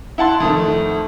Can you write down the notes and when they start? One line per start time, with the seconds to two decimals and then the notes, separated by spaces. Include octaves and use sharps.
0.18 E4 F#5 A5 C6
0.40 F2 D#3 A3